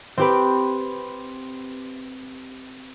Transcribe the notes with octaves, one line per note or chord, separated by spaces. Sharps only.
C4 G4 B4